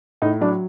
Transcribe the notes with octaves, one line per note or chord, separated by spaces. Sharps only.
A2 D#4
F#3 D4